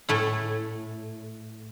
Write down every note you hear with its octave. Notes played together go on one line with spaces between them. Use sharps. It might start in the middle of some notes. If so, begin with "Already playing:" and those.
A2 A3 E4